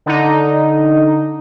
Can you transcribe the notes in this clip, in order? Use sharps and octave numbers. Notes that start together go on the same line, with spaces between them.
D3 D#4